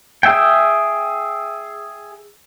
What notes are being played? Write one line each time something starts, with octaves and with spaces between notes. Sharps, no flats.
G#4 E5 G5